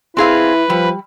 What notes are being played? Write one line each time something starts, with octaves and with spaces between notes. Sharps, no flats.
C4 E4 G#4 B4 F5
F3 G3